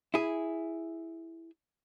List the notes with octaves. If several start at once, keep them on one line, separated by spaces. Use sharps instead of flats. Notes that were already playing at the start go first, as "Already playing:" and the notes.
E4 G#4